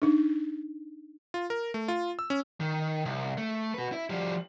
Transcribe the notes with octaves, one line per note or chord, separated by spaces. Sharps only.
D4 D#4
F4
A#4
A3
F4
E6
C#4
D#3
C2
A3
F#4 B4
E4
F3 G3